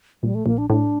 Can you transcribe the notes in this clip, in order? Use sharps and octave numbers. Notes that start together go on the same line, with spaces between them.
A#1 G3
A3
A#1 A#3
D4
A2 D4